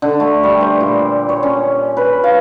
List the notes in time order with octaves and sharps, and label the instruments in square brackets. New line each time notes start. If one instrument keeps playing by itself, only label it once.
[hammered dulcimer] D3
A3
G3
C5
A#2
C#5
C#4
B4
F5